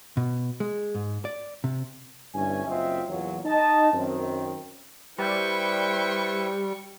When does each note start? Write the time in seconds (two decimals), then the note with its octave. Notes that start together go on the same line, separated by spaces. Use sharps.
0.17 B2
0.60 G#3
0.95 G#2
1.25 D5
1.64 C3
2.34 G1 G2 C#4 E4 G#5
2.67 F#1 F#2 C4 F4 D#5 E5
3.08 E2 A#2 F#3
3.45 D#4 D#5 A5
3.93 F#2 D#3 C4
5.18 G3 E4 B4 C5 G5 C#6